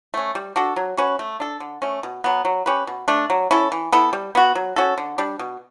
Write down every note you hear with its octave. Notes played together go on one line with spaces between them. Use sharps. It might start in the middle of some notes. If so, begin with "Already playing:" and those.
A3 C#4
G3
D4 F#4 A4
F#3
C#4 F#4 B4
A3
D4 A4
D3
A3 C#4
B2
F#3 B3
F#3
C#4 G4 B4
B2
A3 D4
F#3
C#4 E4 A4
E3
B3 E4 A4
G3
B3 F#4
F#3
C#4 F#4 A4
D3
G3 D4
B2